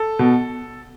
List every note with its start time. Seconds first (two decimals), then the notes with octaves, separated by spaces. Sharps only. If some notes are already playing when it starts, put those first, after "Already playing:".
Already playing: A4
0.19 B2